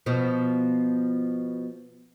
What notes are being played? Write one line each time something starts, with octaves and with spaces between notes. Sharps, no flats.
B2 F3